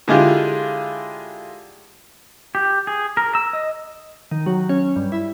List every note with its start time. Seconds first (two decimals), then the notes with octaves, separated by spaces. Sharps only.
0.08 D3 G#3 E4 F4 G4
2.55 G4
2.87 G#4
3.17 A#4
3.35 E6
3.53 D#5
4.31 D#3
4.46 F#3
4.69 C#4
4.96 G2
5.12 E4